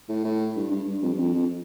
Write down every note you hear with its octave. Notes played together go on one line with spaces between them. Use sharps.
A2
A2
G2
G2
G2
F2
G2
F2
F2